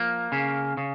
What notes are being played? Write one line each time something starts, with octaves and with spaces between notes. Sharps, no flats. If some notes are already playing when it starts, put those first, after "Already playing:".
Already playing: F3 A#3
C#3
C#3